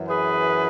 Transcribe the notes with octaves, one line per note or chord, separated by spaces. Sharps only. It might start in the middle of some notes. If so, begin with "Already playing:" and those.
Already playing: F#2 E3
G#4 B4